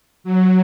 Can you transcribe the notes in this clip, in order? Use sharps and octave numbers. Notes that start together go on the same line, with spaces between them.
F#3